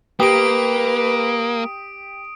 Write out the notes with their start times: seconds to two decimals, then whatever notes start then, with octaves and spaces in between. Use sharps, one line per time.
0.20 A#3 G4 B4 D#6 D7